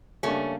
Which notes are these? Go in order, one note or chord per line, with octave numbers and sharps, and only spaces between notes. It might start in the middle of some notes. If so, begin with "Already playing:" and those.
C#3 G3 A3 A#3 C#4 D4